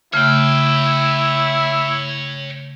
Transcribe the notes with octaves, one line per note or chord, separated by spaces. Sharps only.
C#3 A3 E4 C#5 G5